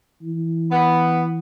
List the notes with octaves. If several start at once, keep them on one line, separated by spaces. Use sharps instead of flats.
E3
B3